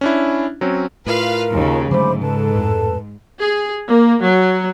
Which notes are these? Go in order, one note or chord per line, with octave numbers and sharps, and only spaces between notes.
C#4 D4 E4
F#3 C4 C#4
A2 F4 A#4 B4 F5
D#2 C#3
G#2 D3 F#3 A3 C5 B5 D6
C#3 A4 B4 A5
F2 A2
G#4
A#3
F#3